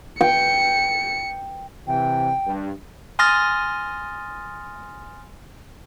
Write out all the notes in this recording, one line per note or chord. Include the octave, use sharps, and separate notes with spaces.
G5 C#7
C3 E3 G5
G2
G#5 C6 D#6 F6 A6 A#6